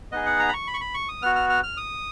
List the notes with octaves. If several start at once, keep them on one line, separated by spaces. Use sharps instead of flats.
B3 D#4 G#4 D#5
F#5
A#5
B5
C#6
B5
C#6
B5
C#6
D#6
B3 F#4 F6
F6
F6
F6
D#6